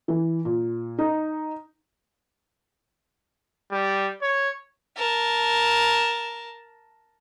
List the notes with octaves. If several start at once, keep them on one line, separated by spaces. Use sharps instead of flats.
E3
A#2
D#4
G3
C#5
A#4 A5